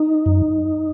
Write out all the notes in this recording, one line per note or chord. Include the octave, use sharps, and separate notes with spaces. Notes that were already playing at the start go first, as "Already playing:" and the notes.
Already playing: D#4
F#2